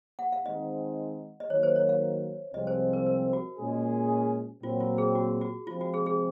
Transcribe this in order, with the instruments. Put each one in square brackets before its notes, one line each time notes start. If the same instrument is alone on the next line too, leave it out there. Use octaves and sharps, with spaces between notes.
[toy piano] F#5
F5
[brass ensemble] D#3 G#3 C4 D#4 [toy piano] D#5
[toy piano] D#5
[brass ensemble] D#3 F#3 A#3 [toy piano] C#5
[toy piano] C5
C#5
F5
[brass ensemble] C2 C3 F3 G#3 C4 [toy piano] D#5
[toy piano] C5
A#4
A#4
F#4
[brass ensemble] A#2 G#3 C#4 G#4
[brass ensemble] A#2 F#3 C4 [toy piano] F4
[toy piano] F4
G#4
F#4
F#4
[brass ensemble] C3 F3 G#3 C4 [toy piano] F4
[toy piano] F#4
G#4
G#4